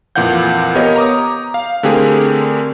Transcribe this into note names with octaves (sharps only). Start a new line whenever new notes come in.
F2 A#2 E3 F5 F#5 G6
B3 G4 A#4 C#5 D#5
A#5 D6 D#6
F5
D3 A3 C4 G4 G#4 A#4